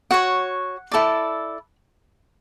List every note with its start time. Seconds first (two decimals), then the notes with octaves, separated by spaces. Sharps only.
0.11 F#4 C#5 F#5
0.92 E4 A4 D5